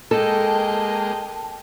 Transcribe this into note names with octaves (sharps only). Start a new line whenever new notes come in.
G#3 A#3 A4 D#5 G5 A5